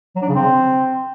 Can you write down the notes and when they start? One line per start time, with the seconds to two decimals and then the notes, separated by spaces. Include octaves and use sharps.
0.16 F#3
0.22 D4
0.29 C#3
0.35 C4